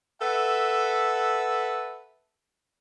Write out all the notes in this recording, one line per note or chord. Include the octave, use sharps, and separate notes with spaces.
A4 B4 E5 F#5